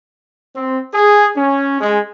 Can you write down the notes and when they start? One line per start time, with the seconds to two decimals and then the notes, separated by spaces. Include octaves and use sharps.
0.55 C4
0.94 G#4
1.36 C#4
1.81 G#3